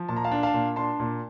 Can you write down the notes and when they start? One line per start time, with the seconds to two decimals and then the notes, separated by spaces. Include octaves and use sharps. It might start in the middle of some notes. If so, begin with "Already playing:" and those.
Already playing: F3
0.09 A#2 A5
0.17 A#5
0.24 F5 A5
0.31 D4
0.43 F5 A5
0.54 A#2
0.76 D4 A5 C6
0.99 A#2